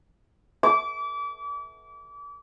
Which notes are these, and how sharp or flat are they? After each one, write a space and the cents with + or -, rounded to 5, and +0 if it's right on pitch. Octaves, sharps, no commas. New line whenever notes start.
D6 -35